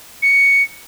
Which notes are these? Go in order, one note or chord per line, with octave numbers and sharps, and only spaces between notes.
C#7